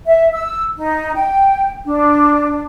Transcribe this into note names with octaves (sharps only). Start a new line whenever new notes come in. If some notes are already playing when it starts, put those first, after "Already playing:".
E5
E6
D#4
G5
D4